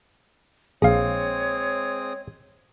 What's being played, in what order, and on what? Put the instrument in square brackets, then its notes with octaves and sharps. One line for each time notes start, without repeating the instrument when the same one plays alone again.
[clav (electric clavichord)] A#1 [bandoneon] G#3 C4 D#6 [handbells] G#4 F5 [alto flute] C#5